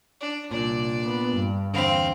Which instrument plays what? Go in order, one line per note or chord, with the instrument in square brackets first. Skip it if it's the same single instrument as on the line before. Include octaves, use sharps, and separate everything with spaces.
[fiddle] D4
[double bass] C2 [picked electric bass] A#2 [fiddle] D4 D5
[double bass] B3
G2
[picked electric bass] E2 D3 [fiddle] C4 F5